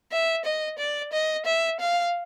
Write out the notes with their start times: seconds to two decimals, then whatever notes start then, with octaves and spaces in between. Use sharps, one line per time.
0.12 E5
0.45 D#5
0.79 D5
1.13 D#5
1.46 E5
1.80 F5